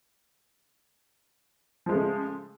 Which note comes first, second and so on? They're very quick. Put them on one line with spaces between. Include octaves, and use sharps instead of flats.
F3 G#3 A3 C#3